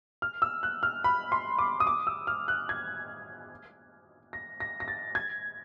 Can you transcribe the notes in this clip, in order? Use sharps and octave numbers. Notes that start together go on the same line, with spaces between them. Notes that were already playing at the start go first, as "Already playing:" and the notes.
F6
E6
F#6
F6
B5
C6
D6
D#6
D6
E6
F6
F#6
G#6
A#6
A#6
A#6
A6
G#6